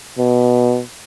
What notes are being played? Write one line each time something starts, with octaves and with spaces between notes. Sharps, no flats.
B2